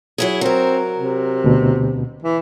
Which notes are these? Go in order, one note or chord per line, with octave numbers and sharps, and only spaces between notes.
F#3 E4 G#4
F#3 C4 A#4
C3
D2 B2
E3